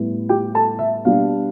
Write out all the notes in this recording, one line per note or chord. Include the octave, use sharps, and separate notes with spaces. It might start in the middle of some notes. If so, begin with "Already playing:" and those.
Already playing: A2 G3 B3
G4 G5
A4 A5
E5
B2 G3 D4 F5